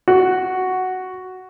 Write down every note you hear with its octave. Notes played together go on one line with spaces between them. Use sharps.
F#4